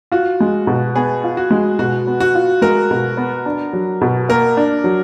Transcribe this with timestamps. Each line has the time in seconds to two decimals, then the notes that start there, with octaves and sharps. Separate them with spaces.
0.12 F4 F#4
0.40 G#3
0.67 B2
0.95 B3 G#4
1.24 F4
1.37 F#4
1.51 G#3
1.79 B2 F#4
2.07 B3
2.20 F#4
2.35 F4
2.62 G#3 A#4
2.91 B2
3.17 B3
3.46 D4
3.73 F#3
4.01 B2
4.29 A#3 A#4
4.57 D4
4.84 F#3